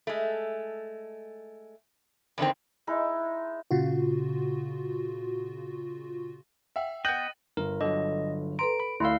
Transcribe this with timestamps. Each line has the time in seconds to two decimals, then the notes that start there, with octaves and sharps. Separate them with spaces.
0.07 G#3 A3
2.38 E2 D3 D#3 C4
2.87 G#3 D#4 E4
3.71 A#2 C#3 F4 F#4
6.76 E5 F#5 G5
7.05 B3 D#5 G5 F#6 A6 D#7 F#7
7.57 G1 A#4
7.81 D3 F#3 D#5
8.59 A4 B4 A#5 C6 D7
8.80 B5
9.00 D2 A3 E4 D5 F5 B5 C6 E6